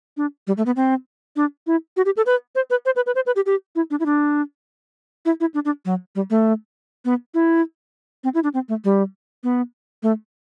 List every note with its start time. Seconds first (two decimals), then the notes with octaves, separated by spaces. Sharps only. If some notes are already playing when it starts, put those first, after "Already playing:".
0.17 D4
0.47 G3
0.57 A3
0.66 B3
0.76 C4
1.36 D4
1.67 E4
1.97 F#4
2.06 G4
2.17 A4
2.26 B4
2.55 C5
2.70 B4
2.86 C5
2.96 B4
3.06 B4
3.15 C5
3.26 B4
3.36 G4
3.46 G4
3.76 E4
3.91 D4
4.00 E4
4.06 D4
5.25 E4
5.40 E4
5.54 D4
5.65 D4
5.85 F#3
6.15 G3
6.30 A3
7.05 B3
7.34 E4
8.24 C4
8.35 E4
8.44 D4
8.54 C4
8.69 A3
8.84 G3
9.44 B3
10.03 A3